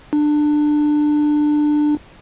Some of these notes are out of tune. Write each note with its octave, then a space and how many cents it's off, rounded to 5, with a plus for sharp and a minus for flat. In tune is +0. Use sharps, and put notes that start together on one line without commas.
D4 +20